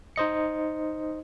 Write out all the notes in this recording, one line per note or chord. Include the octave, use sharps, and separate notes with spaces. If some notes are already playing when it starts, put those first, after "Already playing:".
D#4 C5 D#5 C#7